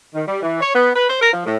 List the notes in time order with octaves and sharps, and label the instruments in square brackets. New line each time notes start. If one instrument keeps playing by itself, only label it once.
[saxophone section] D#3
G3
E3
C#5
B3
B4
C5
A#4
F3
A2